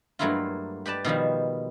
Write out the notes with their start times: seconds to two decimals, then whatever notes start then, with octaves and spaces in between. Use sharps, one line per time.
0.19 G2 F#3 A3 A#3 E4 F4
0.86 G4 B4 D5 A5
1.05 B2 D#3 F3 G3